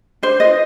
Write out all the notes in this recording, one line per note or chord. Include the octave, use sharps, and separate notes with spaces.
D4 C5
F4 B4 D#5